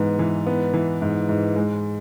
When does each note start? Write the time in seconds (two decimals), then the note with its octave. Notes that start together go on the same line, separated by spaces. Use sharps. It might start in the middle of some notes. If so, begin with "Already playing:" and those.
Already playing: G#2 E3 B3
0.19 E3
0.47 B3
0.74 E3
1.02 G#2
1.29 G#2
1.56 G#3